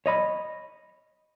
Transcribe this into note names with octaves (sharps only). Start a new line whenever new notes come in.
C#5 D#5 B5